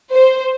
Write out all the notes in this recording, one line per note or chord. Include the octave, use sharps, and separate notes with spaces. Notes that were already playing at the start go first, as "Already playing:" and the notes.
C5